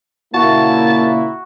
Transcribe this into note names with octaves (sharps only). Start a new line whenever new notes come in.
A#2 C#3 A#3 E4 F#4 A5